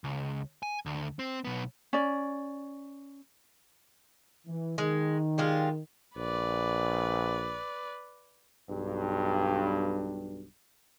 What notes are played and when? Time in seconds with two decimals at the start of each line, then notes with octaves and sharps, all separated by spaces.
0.04 C#2
0.63 G#5
0.86 D2
1.19 C4
1.45 B1 B3
1.93 C#4 D5
4.47 E3
4.78 D#3 G#3
5.38 G3 G#3 F4
6.17 A#1 B4 D5
8.69 B1 G2